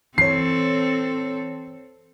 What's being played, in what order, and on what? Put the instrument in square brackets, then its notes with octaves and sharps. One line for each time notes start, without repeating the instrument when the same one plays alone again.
[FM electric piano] E3 C#5 [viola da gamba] C4 A4 [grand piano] C7